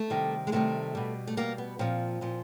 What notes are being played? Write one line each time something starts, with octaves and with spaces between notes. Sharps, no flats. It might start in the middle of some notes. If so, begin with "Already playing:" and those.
Already playing: A3
C3 D#3 G3
G#3
C3 D#3 G3 A3
B2 G3
A3
B2 G3 A#3
B3
A#2 F3 C4
A#2 F3